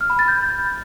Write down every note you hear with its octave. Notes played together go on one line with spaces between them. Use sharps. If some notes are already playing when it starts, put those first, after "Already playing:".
F6
B5
A6
G6